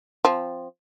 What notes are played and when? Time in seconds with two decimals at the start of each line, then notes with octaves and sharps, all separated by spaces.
0.25 F3 C4